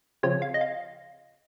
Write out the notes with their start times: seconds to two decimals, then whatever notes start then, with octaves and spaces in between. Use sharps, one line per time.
0.23 C#3 F3 C4 F4 C#5
0.42 F5
0.54 D#5
0.61 F5